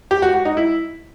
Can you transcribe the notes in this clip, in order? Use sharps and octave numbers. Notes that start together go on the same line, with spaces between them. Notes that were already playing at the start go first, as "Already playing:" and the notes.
G4
F#4
F#4
D#4
E4